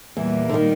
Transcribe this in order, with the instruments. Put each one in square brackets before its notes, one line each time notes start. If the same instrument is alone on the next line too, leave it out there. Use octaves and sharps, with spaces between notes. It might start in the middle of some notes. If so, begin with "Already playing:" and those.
[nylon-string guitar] E2 E3 [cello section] A#2 G3 A#3
[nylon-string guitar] D3
D#3